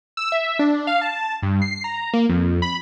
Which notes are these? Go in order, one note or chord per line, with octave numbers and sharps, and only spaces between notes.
E6
E5
D4
F5
A5
G2
C7
A#5
A#3
F2
B5